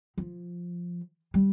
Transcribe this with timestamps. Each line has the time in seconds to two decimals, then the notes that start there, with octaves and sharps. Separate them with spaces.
0.18 F3
1.34 G3